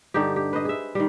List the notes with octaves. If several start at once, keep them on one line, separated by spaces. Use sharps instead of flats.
G2 D3 D#4 G4
G4
B4 C5 D#5
G#4 E5
D#3 G3